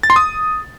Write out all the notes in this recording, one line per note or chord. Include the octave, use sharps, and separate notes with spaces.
A6
C6
D#6